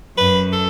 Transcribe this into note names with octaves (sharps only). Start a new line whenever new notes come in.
F#2 B4
A4